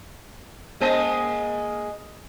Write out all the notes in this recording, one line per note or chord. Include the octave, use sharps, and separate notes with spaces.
G#3 A#3 D#5